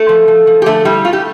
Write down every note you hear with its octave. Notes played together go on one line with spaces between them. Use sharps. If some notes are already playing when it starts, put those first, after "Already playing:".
Already playing: A3 A4
F3
F3
F3
G4
D3 A3 A4
G3 E4 G4
A3 F4
G4